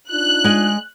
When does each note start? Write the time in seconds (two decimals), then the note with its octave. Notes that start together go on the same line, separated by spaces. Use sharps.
0.11 D4 D#4 F4 F#6
0.44 G#3 G#5